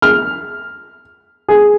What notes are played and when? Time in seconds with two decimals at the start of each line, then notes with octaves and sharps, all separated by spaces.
0.02 F6
1.48 G#4